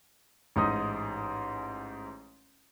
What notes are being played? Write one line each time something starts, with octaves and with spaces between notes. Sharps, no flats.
A1 G#2 D#4 D#6